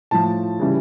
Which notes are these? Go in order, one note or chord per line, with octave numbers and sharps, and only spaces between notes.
A2 F3 A5
C#3 E3 G3